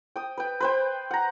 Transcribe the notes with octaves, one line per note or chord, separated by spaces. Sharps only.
G5 D#6
B4 G5
B4 C5 G5
F#5 A#5